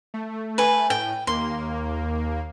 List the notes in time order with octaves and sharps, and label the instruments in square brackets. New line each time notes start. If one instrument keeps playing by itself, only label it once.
[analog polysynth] A3
[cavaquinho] B4 G#5
[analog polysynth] A2 [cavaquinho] G5
[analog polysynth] D#2 A#3 [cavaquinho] C6